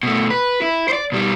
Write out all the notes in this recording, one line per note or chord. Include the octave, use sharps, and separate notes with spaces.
B2 A3
B4
E4
C5 D5
B2 G3